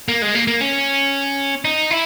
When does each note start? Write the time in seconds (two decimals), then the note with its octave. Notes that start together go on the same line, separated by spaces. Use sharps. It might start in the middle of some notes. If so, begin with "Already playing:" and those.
0.08 A#3
0.22 G#3
0.35 A#3
0.47 A#3
0.61 C#4
1.65 D#4
1.91 E4